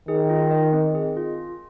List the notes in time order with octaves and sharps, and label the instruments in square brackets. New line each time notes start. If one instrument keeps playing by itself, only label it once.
[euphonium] D#3 [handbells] G#4
[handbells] F4
D#5
C4
G#4
F4